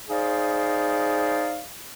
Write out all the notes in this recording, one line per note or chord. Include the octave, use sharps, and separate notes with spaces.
D#4 G#4 C5 D5 F5